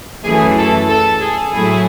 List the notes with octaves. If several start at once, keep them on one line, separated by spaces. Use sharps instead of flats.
F#2 E3 A3 E4 G#4
A4
A4
G#4
A2 F#3 A3 E4 G#4